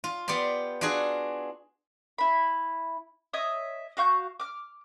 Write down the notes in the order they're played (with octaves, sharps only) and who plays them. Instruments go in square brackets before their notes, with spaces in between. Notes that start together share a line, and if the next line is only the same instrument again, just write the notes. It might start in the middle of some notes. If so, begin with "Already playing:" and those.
[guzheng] F4
B3 G4 D5 C6
D4 F4 F#4 G#4
[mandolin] E4 B5
C#5 D#5 E5 D#6
F#4 F5 C#6 G6
D6 F6